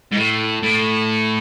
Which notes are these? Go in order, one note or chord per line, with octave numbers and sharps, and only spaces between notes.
G#2
A2
A2